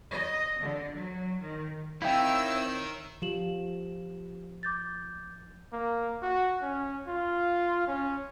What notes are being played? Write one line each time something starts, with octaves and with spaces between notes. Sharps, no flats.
D#5
D3
F#3
D#3
D#3 C4 D#4 E4 C#5 F5 G5 E6
F3 G4 E7 F#7
D6 G6 A6
A#3
F#4
C#4
F4
C#4